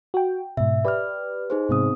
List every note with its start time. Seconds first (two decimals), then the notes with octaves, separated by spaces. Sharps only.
0.14 F#4 G5
0.57 G#2 B2 E5
0.85 G4 B4 D5 D6 F6
1.50 D#4 G#4 C5
1.69 G#2 C3 B3 C4 D#6